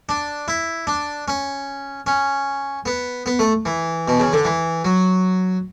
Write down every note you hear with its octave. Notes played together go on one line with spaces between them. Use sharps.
D4
E4
D4
C#4
C#4
B3
B3
A3
E3
B2
C#3
D3
E3
F#3